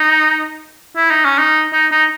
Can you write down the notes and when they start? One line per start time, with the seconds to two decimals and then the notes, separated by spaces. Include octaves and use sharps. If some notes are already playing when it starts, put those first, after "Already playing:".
Already playing: D#4
0.96 E4
1.11 D#4
1.25 C#4
1.38 D#4
1.73 D#4
1.92 D#4